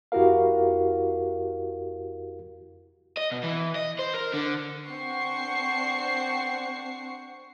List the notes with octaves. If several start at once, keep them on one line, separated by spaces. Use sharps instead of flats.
F2 E4 F#4 G4 A#4 F5
D#5
B2
E3
D#5
C5
A#4
D3
C4 D4 C5 F#5 C#6 C7